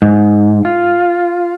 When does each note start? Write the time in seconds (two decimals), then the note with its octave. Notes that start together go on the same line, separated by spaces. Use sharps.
0.02 G#2
0.65 F4